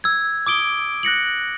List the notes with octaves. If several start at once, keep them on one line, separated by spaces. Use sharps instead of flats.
E6 G#6
D6 D#6 D7 G7
F#6 A#6 C#7 F#7